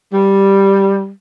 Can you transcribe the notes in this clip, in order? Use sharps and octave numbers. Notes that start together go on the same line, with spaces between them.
G3